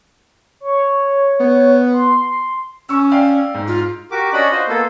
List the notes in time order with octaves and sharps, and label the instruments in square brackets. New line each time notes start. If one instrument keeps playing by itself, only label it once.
[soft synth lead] C#5
[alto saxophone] B3
[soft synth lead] C6
[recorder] C#4 [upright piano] C#6 E6
[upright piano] D5 F5 G5
G#2
[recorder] F4
[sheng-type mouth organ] F#4 G4 A#4 D6
C#4 D4 F#4 D#5 F#5 B5
F4 F#4 C5 D#5
A#3 B3 F4 A4